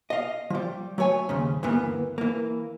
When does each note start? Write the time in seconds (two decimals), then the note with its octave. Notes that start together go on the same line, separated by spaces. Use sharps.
0.10 D#5 F5
0.50 F3 G3
0.98 F#3 A3 C#5 G#5
1.29 D#2 G#2 C#3
1.63 D2 G2 E3 A#3 B3
2.18 E3 A#3